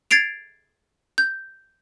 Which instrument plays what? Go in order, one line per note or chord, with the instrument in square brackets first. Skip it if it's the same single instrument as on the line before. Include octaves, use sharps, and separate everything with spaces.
[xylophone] G#6 A6 C7 D7 F7
G6